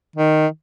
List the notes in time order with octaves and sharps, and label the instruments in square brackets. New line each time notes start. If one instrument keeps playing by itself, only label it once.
[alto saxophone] D#3